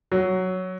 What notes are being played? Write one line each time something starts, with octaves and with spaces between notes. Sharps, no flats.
F#3